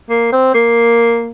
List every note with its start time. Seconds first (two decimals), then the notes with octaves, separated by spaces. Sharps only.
0.10 A#3
0.32 C4
0.54 A#3